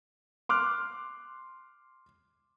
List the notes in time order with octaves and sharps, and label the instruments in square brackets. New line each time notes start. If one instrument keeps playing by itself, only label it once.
[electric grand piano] C6 D6 F6 F#6